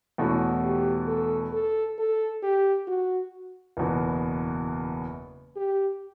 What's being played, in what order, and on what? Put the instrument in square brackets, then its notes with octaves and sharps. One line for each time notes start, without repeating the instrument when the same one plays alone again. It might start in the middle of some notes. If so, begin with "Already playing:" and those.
[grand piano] E2 B2 A3 C#4 F#4 [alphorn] E4
[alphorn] G4
A4
A4
A4
G4
F#4
[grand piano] F#1 E2 B2
[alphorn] G4